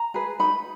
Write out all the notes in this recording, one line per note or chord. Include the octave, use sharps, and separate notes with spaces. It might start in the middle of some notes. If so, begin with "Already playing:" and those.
Already playing: A#5
G#4 B4
D#4 B5